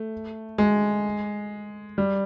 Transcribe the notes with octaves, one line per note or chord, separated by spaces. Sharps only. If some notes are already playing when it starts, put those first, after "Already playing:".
Already playing: A3
G#3
G3